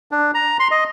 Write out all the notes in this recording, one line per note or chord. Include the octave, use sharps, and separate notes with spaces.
D4
A#5
C6
D#5